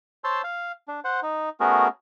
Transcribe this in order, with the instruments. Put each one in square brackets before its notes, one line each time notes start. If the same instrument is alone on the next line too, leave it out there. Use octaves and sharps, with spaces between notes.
[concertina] C5 C#5 A5 C6 E6
F5
D4
C5 F#5
D#4
A3 B3 C#4 F#4 G#4 A#4